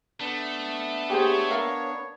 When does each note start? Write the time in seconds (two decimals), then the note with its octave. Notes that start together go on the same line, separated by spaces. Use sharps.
0.20 A3 B3 D4
1.10 G4 G#4 C5 C#5
1.51 A#4 F5